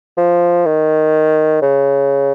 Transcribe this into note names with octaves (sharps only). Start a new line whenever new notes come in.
F3
D#3
C#3